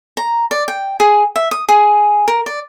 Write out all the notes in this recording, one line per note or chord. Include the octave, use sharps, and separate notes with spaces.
A#5
D5
G5
G#4
E5
D#6
G#4
A#4
D5